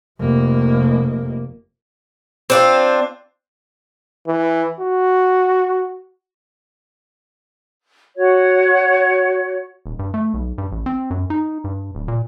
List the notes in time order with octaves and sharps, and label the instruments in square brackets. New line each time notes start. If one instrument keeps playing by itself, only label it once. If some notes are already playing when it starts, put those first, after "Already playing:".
[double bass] F1 A#3
[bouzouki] C4 D4 F4
[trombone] E3
F#4
[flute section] F#4 C#5
[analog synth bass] D#1
G2
A3
B1
G2
A1
C4
F#2
D#4
G2
D1
A#2